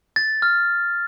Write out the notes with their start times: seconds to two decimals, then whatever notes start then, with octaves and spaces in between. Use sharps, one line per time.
0.16 A6
0.42 F6